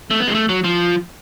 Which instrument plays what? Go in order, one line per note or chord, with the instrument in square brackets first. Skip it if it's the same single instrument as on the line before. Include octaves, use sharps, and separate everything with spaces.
[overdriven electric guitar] A3
B3
G#3
A3
F#3
F3